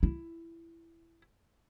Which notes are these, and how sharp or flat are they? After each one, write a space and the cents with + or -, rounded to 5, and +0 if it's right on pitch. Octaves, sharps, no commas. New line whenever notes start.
E4 +15